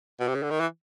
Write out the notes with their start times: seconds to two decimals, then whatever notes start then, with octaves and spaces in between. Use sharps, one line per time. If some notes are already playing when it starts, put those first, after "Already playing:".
0.20 B2
0.28 C3
0.35 C#3
0.42 D3
0.50 D#3
0.60 E3